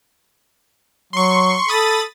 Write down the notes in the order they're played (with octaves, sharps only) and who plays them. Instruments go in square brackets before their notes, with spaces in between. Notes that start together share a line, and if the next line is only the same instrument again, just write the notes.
[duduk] F#3 [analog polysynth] C6 C#6
[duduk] A4 [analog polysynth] B5 D#6 A6